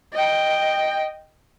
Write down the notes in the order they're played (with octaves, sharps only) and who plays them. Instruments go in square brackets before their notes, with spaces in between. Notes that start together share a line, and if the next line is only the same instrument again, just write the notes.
[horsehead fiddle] D#5 G5